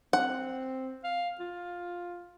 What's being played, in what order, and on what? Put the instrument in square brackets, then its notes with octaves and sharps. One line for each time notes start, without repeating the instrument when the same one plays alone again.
[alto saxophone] C4 [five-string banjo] F#5
[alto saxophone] F5
F4